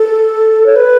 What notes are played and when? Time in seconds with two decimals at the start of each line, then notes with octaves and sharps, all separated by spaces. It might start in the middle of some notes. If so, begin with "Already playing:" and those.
Already playing: A4
0.66 C#5
0.76 B4